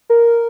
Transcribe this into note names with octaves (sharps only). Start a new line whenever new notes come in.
A#4